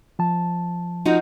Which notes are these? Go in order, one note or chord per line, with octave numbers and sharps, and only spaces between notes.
F3 A5
F3 D#4 F#4